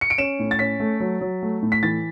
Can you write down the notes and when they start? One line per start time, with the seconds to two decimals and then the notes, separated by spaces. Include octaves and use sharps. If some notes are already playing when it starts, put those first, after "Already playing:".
0.01 C#7
0.10 D7
0.18 C#4 E7
0.39 A2
0.51 A6
0.59 C#4 B6
0.80 A3
1.00 F#3
1.21 F#3
1.42 A3
1.62 A2
1.72 B6
1.83 E3 A6